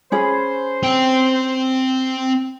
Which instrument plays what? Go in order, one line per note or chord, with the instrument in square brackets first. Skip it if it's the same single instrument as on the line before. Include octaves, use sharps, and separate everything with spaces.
[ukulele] C#4 G#4 B5 [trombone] C5
[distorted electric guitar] C4 G5